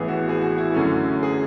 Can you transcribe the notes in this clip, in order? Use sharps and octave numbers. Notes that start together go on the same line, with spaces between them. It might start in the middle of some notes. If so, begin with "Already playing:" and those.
Already playing: A1 A2 E3 B3 E4 G#4
F#4
G#4
F#4
E4
F#2 D3 A3 C#4
G#4